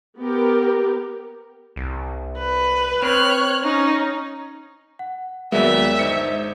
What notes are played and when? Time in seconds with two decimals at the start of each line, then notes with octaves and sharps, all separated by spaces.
0.18 B3 G4 A#4
1.76 C2
2.38 B4
3.02 C4 C#5 F6 F#6
3.63 C#4 D#4
4.99 F#5
5.52 D#2 F#3 G#3 B3 A#4 D5 E5
5.99 G1 D#4 C5 C#7